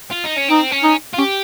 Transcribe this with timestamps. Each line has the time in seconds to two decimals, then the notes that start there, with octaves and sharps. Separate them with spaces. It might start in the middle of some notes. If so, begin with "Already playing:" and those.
0.12 F4
0.25 D#4
0.38 C#4
0.50 C4 D#4
0.72 C#4
0.84 D#4
1.13 F4
1.18 C#4 G4